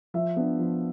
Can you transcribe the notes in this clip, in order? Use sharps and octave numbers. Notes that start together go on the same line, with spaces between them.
F3 E5
B3 D4
F3